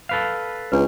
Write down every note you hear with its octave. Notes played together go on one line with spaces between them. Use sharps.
A4 B4 F5
C#2 D4 B4